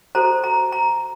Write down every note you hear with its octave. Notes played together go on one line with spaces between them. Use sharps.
F#4 A4 C5 A#5
A#5
A#5